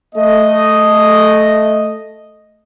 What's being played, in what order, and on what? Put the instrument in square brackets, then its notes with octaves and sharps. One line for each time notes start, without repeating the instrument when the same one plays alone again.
[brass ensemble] A3 D#5